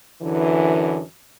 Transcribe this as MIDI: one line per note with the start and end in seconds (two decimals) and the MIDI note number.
0.22 1.01 42
0.22 1.01 50
0.22 1.01 52